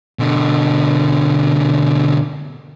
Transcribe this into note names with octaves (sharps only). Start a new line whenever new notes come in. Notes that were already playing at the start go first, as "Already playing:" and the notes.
B2 D3